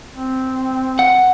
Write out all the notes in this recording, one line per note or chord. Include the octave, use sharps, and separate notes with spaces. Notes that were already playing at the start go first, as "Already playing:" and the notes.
C4
F#5